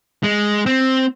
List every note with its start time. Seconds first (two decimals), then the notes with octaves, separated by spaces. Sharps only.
0.23 G#3
0.66 C4